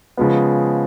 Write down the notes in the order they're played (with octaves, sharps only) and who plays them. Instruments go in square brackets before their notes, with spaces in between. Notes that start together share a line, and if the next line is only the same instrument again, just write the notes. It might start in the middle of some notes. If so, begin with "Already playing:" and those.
[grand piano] C#3 F3 G#3 B3